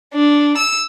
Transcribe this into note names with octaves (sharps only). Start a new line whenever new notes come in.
D4
E6